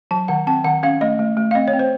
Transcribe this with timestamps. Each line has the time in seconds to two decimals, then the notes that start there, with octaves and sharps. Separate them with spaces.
0.11 F#3 A5
0.28 D#3 F#5
0.47 C4 A5
0.64 D#3 F#5
0.83 C#4 F5
1.01 A3 D#5
1.19 A3
1.37 A3
1.51 F5
1.55 C4 D#5
1.68 C#5
1.73 C4
1.79 C5